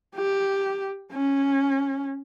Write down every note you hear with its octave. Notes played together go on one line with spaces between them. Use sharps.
G4
C#4